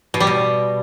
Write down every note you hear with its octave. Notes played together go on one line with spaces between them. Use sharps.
B2
G3
B2